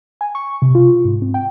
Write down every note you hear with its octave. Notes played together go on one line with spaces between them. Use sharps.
G#5
C#6
C3
F4
G#2
C4
G5